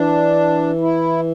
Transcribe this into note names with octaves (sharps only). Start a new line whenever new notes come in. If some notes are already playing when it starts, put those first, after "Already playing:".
Already playing: E3 D4
E4